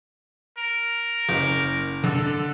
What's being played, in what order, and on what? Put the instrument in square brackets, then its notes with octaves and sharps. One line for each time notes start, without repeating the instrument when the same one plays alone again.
[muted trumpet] A#4
[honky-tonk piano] F#1
[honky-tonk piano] D3 [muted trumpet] A4